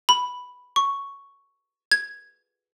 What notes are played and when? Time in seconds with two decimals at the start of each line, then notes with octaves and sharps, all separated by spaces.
0.09 B5
0.76 C#6
1.92 G#6